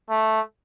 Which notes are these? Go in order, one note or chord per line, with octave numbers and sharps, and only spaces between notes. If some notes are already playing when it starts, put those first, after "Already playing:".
A3